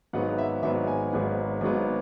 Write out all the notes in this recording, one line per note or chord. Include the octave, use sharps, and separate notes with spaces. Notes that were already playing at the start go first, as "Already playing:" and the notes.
G#1 G#2 F#3 B3 F#5
E5
G#1 G#2 F#3 B3 E5
G#5
G#1 G#2 F#3 B3
G#1 G#2 F#3 B3